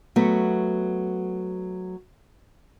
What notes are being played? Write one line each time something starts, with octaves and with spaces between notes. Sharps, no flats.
F#3 A3 B3